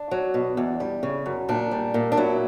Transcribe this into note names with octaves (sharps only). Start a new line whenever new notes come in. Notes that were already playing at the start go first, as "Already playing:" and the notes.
Already playing: D4
F#3
B2
E2
G3
C#3
F#2
A#2 D4
G3
A#2
D4
F#3 E4